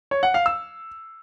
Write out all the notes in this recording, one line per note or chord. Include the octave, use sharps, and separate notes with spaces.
C#5
F#5
F5
E6